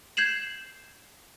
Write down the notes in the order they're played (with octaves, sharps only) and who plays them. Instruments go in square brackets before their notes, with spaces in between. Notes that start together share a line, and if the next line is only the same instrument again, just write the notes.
[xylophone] G6 G#6 C7 E7 F#7